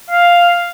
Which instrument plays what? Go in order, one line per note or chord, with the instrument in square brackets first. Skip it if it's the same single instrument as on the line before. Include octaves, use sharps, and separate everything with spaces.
[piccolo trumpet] F5